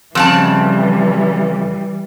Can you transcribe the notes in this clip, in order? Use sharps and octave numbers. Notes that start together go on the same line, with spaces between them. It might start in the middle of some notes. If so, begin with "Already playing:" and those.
F2 C#3 E3 G3 A5